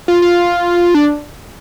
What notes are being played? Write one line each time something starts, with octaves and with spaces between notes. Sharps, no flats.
F4
F4
D4